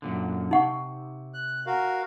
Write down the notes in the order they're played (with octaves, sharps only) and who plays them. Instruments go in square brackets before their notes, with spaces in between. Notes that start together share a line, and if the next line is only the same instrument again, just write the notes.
[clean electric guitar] F#2 A#2 D3
[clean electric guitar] C3 [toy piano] D#4 F#5 C#6
[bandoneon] F#6
F#4 A#4 F5